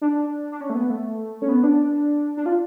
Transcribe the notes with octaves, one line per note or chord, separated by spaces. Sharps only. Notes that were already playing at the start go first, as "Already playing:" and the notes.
D4
D4
C#4
A3
B3
A3
C#4
B3
D4
D4
F4